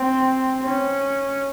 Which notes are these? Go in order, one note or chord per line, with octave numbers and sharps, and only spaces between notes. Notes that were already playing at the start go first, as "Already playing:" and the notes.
Already playing: C4
C#4